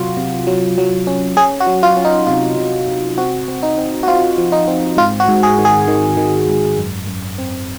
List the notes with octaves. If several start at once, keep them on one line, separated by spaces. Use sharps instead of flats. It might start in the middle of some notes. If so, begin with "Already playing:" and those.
Already playing: C3 F#3 F4 F#4
C3
F#3
F#3
C#4
C#4 G#4
F#4
F#3
F4
C#4
D#4
C3 F4
C3
C3
C4 F#4
C4
D#4
C4
F#4
C4 F4
F3
D#4
C4
G#2 F4
F#4
G#2
G#4
D#3
G#4
D#3
D#3
G#2
F#2
F#2
C4